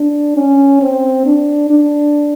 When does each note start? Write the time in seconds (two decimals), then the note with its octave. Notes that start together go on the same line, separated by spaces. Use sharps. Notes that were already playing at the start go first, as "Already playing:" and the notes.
Already playing: D4
0.37 C#4
0.82 C4
1.26 D4
1.71 D4